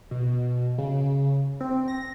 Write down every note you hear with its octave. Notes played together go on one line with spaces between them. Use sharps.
B2
C#3
C4
A#6